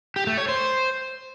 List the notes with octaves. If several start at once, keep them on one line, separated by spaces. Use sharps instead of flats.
G4
A3
C#5
C5